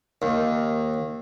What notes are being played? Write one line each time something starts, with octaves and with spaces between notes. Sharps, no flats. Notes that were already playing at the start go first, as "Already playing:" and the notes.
D#2